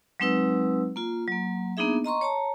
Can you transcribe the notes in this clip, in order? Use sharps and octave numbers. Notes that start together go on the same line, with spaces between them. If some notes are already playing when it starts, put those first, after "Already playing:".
F#3 G#3 C4 D#4 B4 E6
A#3 F4
F#3 A#3
A#3 B3 D4 D#4 G#4 E5
D#5 A#5 C6 C#6
C#5 A5 A#5